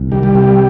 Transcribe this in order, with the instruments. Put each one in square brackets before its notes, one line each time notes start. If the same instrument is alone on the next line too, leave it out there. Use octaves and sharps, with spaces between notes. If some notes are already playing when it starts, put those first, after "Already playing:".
Already playing: [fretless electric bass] C2
[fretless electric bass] D#3 [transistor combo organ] G3
[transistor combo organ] G3
[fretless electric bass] C3